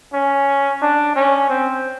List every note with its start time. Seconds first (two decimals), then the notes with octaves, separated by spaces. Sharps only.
0.13 C#4
0.82 D4
1.15 C#4
1.49 C4